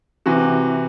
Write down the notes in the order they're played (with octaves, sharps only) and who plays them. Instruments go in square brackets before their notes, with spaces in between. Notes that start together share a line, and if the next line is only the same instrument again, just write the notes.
[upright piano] C3 E3 F#4